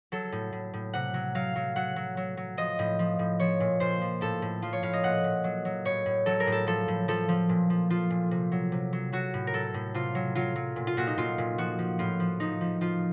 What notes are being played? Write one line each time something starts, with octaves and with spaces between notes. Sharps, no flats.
F#3 A4
A2
A2
A2
C3 F#5
F#3
F#3 F5
F#3
F#3 F#5
F#3
F#3
F#3
F3 D#5
A2
F3
A2
F3 C#5
A#2
A#2 C5
F3
A2 A4
A2
F3 F4
C#5
A2 F5
D#5
A#2 F#5
A#2
F#3
F#3
A2 C#5
A2
F#3 A4
A#4
A2
A4
F3 A4
A2
F3 A4
F3
A#2
F3
F3 F4
A#2
C3
F#3
C3
F#3
F#3 F#4
A2
A#4
F#3 A4
A2
C3 F4
F#3
F#3 F4
F#3
A#2
F4
A#2 F#4
D#4
A#2 F4
A#2
F3 F#4
F3
A2 F4
F3
F3 D#4
F3
F3 F4